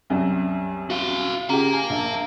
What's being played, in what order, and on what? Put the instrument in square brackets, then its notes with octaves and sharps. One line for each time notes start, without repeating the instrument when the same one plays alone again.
[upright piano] C2 F#2
[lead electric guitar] F#4 F5
[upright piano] C#3 F4 G4 [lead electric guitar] F5 A#5
[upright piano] G#5
A#1 A5